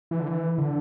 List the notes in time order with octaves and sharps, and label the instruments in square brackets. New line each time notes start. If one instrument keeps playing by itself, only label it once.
[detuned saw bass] E3
D3
E3
D3